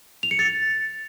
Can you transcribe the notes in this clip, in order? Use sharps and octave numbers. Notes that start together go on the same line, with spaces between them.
F7
C#7
A6